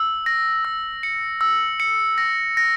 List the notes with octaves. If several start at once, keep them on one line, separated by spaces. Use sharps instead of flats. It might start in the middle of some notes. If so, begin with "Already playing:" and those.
Already playing: E6
A#6
E6
C#7
E6
C#7
A#6
A#6